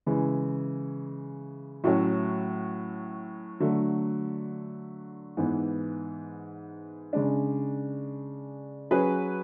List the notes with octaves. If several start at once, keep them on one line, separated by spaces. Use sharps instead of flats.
C#3 E3 G#3
A2 F#3 A3 C#4 F#4
D3 F#3 A3
G#2 E3 B3
C#3 G#3 D4
F#3 C#4 G#4 B4